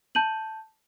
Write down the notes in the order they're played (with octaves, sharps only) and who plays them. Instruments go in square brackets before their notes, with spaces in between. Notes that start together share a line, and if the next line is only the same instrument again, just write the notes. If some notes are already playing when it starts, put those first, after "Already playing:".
[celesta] A5 G6 D#7 F#7